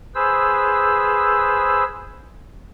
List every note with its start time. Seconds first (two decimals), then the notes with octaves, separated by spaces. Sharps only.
0.15 G#4 B4 C5 E6